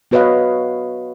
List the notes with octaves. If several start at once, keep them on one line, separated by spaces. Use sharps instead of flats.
B3 F#4 B4 C#5 D#5 F5